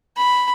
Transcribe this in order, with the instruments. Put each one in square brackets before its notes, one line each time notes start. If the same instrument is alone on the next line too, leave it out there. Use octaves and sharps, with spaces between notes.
[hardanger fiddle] B5